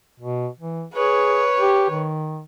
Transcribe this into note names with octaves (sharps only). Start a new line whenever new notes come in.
B2
E3
G#4 B4 C#5
G4
D#3